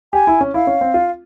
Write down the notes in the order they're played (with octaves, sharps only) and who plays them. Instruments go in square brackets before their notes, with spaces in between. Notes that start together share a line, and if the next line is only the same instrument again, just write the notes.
[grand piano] G4 [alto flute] G#5
[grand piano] E4
C#4
[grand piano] E4 [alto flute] F5
[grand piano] C#4
C4
F4